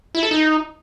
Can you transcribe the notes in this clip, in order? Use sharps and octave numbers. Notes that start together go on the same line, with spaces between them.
E4
A4
D#4